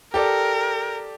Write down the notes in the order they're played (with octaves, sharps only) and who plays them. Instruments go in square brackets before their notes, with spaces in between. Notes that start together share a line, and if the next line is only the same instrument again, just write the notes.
[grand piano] G4 A4 D5 [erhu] A#4